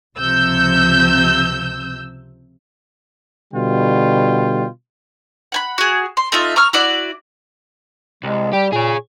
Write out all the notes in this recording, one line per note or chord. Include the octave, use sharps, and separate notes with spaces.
C#2 C3 F3 E6 G6
B2 D3 G3 F4 G5
F#5 G#5 B5
F#4 G#4
C6
A3 D#4 F4 E5
A#5 C#6 E6 F6
E4 F#4 D5
C2 G#3
G3 G4
A#2 G#4 C#5